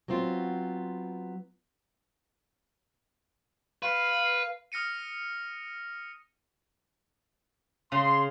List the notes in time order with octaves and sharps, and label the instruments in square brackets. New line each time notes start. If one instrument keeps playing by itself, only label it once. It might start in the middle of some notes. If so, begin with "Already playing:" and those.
[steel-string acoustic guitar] F#3 B3 C4 F4
[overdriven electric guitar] B4 [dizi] F5
[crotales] D#6 F6 A#6 C#7 D#7
[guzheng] C#3 [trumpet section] C6